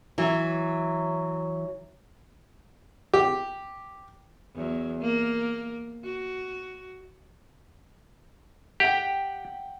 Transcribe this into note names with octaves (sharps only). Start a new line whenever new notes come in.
E3 F#3
G4
E2 F#3
A#3
F#4
G4 F#5 G5